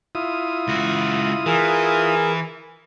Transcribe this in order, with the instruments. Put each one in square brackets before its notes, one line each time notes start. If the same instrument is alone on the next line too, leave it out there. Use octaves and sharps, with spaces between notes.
[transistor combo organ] E4 F4 D#6
[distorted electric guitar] C#2 F#4
[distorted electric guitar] E3 [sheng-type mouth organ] G#4 A#4